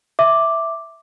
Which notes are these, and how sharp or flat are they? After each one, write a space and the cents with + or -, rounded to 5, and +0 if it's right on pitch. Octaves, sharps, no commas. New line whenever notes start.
E5 +0 D6 +0